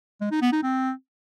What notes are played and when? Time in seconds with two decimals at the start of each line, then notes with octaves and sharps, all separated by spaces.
0.21 G#3
0.31 D#4
0.42 B3
0.52 D#4
0.63 C4